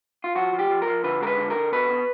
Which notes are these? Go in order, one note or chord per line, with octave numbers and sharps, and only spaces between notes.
F4
F3 F#4
F3
G4
F3
A#4
F3
D3 B4
G#3 A#4
B4
D3
A#4
D3
B2 B4
B2